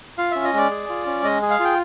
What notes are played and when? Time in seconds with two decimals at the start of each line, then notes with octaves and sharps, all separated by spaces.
0.18 F4 F5
0.31 C#4 E5
0.44 D#5
0.53 G#3 D5
0.71 G#4
0.89 F4
1.06 C#4
1.24 G#3 D#5
1.42 G#4
1.51 F5
1.60 F4 G5